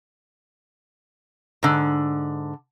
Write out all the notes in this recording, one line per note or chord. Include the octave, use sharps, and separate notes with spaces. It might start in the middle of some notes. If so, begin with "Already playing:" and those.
G#2 D3